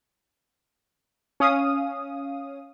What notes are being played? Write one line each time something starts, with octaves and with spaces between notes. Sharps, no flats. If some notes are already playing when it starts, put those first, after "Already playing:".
C#4 F5 D#6